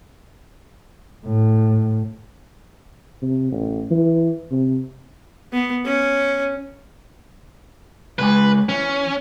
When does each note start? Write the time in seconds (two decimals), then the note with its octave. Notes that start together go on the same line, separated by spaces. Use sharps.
1.26 A2
3.22 C3
3.52 A1
3.91 E3
4.51 C3
5.53 B3
5.85 C#4
8.19 C#3 G#3 B4 G#5
8.69 E3 C#4